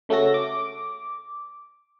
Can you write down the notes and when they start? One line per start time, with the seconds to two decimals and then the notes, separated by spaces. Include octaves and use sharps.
0.09 C#3 A3 C#4 F#4 A4 A#6
0.34 D6